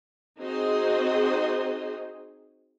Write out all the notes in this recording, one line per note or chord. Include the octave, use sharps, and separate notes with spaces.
C4 D#4 F#4 G#4 C5 D#5